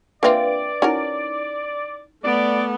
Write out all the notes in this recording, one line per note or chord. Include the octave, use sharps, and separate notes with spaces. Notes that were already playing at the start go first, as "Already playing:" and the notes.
A#3 C4 D4 F4 B4 D5 E5
C#4 D#4 E4 F#4 A#4
A3 B3 D5